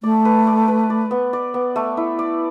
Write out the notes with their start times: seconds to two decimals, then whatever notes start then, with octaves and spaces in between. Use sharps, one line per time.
0.03 A3 D5
0.25 B4
0.47 D5
0.68 B4
0.90 D5
1.11 B3
1.33 D5
1.54 B3
1.76 A3
1.97 E4
2.19 D5